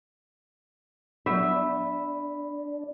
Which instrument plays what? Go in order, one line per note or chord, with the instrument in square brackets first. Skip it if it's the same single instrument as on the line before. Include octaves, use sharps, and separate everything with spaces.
[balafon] F#3 B3 F#5 [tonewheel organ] D4 [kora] E5 [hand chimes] B5